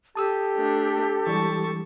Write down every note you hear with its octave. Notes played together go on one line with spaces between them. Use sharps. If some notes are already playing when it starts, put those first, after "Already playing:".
G4 A4 A5 D#6 E6
A3 D4
E3 G3 G#3 A5 C#6